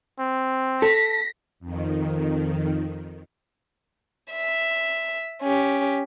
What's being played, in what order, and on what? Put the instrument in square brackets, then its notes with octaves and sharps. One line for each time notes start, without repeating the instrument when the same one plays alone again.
[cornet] C4
[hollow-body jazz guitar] A4 [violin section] A#6 B6
[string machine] F2 D#3
[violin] E5
C#4 G4